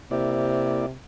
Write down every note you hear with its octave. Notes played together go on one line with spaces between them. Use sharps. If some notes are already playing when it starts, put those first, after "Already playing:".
C3 A#3 E4 D5